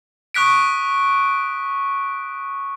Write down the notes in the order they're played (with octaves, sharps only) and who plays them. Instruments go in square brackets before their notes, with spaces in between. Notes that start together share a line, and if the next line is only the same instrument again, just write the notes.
[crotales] C#6 D#6 F#6 B6 D7